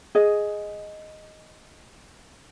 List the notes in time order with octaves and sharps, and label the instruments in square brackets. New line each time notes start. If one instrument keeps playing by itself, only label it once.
[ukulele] G#4 D#5